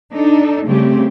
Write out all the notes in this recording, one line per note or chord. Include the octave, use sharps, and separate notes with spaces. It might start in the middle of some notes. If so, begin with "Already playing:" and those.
D4 D#4 A4
C#3 G3 A3 C4 G4